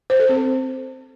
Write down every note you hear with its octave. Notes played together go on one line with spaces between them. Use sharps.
C5
A4
C4